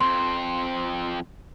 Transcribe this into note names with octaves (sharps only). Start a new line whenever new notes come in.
F2 C4 C6